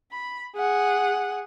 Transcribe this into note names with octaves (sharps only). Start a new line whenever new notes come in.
B5
G#4 F#5